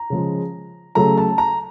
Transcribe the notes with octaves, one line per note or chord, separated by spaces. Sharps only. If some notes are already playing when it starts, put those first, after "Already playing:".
Already playing: A#5
C#3 F3 G#3
C#3 F#3 A3 A#5
A5
A#5